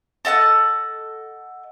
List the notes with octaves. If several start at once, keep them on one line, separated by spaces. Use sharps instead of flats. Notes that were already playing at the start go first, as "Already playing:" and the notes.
A4 D#5 F#5 A5